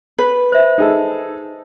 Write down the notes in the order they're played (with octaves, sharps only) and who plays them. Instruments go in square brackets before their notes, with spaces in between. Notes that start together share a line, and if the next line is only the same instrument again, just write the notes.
[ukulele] B4
[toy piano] C5 E5
[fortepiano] D#4 G#4 A4